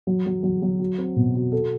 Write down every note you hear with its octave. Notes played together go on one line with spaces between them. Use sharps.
F#3
F#3
F#3
F#3
F#4
C4
B2
F#4
A4